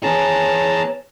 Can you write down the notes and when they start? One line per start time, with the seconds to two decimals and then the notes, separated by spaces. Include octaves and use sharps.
0.03 B3 G#4 C#5 A5 A#5